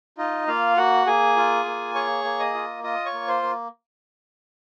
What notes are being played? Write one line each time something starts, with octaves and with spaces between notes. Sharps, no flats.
D#4 F4 D#5
A#3 F4 F5
A#3 F#4 F#5
A#3 G#4 G#5
F4
A#3
G#4 C#5 C#6
A#3
D#5 D#6
F4
F4 D#5 D#6
C#5 C#6
A#3
C5 C6
A#3